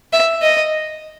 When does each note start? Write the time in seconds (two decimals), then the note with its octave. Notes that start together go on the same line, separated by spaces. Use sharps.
0.13 E5
0.42 D#5